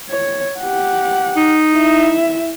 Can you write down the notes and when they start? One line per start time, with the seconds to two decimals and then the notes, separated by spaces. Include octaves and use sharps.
0.11 C#5
0.60 G4 F#5
1.36 D#4
1.74 E4 E5